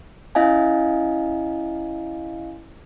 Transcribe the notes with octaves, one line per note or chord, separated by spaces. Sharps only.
C#4 E4 D#5 F5 G#5